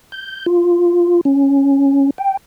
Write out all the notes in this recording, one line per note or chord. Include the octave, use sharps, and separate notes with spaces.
G6
F4
C#4
G5